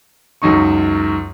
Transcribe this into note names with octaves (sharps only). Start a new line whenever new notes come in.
C#2 F#2 D#4 C#6